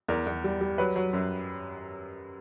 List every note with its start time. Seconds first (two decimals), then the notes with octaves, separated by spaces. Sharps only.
0.08 E2 A#4
0.27 E2
0.44 G3
0.61 G3
0.78 F#3 B4
0.96 F#3
1.13 F#2